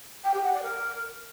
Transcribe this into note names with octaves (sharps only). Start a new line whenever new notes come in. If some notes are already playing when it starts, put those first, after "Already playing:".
G5
G4
F#5
D5
A#4